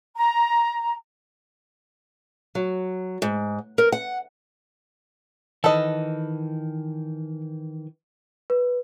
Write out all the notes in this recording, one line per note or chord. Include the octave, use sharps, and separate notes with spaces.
A#5
F#3
G#2
A#4
F#5
D#3 E3 A4 B4 D#5
B4